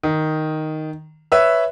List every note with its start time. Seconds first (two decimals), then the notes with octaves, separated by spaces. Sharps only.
0.03 D#3
1.32 B4 C#5 E5 E6